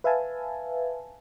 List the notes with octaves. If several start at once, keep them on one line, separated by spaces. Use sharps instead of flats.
B4 E5 F5 G#5 A5